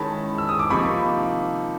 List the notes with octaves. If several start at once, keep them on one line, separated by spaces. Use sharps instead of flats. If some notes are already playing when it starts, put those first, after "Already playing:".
Already playing: D#3 G#3 C#4 E4 A5 B5
E6
D#6
D6
C3 F3 A#3 D#4 B5 C#6